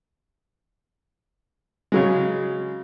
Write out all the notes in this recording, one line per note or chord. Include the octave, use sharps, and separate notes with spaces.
C#3 F#3 G#3